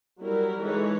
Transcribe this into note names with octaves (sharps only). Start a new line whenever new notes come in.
F#3 G3 E4 A#4
E3 G#3 D#4 A4 C#5